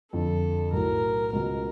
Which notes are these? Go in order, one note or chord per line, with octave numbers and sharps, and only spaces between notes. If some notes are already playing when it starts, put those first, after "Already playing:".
F2 D3 F3 A4
B1 A2 F#3 A#4
C#2 B2 F#3 A#4